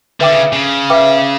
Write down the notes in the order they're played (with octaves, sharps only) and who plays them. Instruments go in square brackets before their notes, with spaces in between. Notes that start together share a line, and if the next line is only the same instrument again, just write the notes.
[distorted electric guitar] D3 [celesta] B4 E5 G5 D6
[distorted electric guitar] C#3
C#3
[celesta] B4 E5 G5 D6